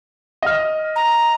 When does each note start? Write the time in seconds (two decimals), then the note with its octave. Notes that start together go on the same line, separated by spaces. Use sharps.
0.42 D#5 F6
0.96 A#5